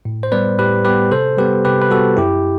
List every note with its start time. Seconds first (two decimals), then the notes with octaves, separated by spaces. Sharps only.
0.05 A2
0.23 C5
0.32 G3 B3 B4 D5
0.58 A2 G4 B4
0.85 G3 B3 G4 B4
1.12 C3 A4 C5
1.37 G3 B3 G4 B4
1.65 C3 G4 B4
1.82 B4
1.90 G3 B3 F#4 A4
2.17 F#2 E4 G4